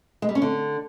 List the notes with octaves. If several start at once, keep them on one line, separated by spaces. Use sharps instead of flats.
G#3
G3
C#4
D3